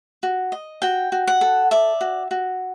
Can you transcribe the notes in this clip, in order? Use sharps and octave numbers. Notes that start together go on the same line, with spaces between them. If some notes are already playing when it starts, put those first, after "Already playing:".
F#4
D#5
F#4 G5
F#4
F#5
A4
D5 E5
F#4
F#4